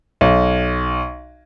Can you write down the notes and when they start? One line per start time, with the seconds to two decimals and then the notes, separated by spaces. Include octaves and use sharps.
0.21 B1